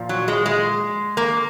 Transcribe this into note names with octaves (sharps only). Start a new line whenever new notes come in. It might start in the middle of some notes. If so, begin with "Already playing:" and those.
Already playing: A#2 F3
F#3
G#3
G#3
A#3